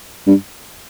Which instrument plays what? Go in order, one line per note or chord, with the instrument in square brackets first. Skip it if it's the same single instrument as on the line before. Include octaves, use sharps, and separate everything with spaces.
[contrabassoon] G2